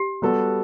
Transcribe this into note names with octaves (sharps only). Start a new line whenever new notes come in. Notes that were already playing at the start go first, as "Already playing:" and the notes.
Already playing: G4
G3 B3 F#4 A4